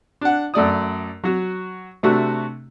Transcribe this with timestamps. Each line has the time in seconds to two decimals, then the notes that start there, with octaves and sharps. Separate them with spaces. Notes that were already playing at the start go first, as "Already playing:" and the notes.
0.21 D4 F#5
0.54 F#2 A3 D5 D#6
1.24 F#3 F#4
2.03 C3 A3 D4 F#4